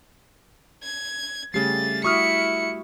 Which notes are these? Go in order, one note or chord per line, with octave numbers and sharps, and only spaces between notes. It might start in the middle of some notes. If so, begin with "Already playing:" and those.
G#6
C#3 G3 A3 G4 A6 C7
E4 F#4 C#6 D#6 F6 C#7